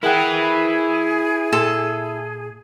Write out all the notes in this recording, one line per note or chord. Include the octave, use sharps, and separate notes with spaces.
E4 G#4 A#4 B4 F#5 G5
A#2 A4 C6